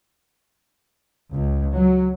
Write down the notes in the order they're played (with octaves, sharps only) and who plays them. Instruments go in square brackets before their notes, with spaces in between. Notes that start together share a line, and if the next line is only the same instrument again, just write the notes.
[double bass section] C#2
F#3